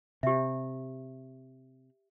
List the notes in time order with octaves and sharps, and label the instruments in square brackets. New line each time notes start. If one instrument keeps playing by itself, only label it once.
[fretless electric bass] C3 [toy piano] G4 E5